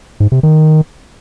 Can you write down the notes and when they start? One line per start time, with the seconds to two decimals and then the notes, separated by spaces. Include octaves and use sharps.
0.20 G#2
0.32 C3
0.43 D#3